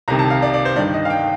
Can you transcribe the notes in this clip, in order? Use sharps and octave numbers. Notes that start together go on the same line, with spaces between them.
C2 C3 D#3 A#5
A5
F5
D5
D5
C5
G2 D#3 D5
D#5
F5
G5